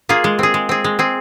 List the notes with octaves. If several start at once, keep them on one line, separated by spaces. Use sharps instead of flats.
A#3 F4 G#4
G#3
C4 G#4
G#3
C4 G#4
G#3
C4 G#4